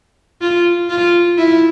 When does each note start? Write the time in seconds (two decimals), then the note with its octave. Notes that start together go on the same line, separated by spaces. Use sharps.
0.41 F4
0.90 F4
1.38 E4